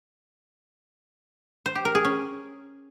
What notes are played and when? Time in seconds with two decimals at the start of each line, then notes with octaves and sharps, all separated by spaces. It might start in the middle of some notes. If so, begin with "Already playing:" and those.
1.66 C5
1.75 G4
1.85 A#4
1.95 G#4
2.05 C#4